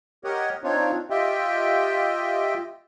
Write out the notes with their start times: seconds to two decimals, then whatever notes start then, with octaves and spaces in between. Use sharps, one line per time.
0.24 G4 A#4 C#5 D#5 F#5
0.64 C4 D4 D#4 F4 C#5
1.10 F4 G4 D#5 E5 G5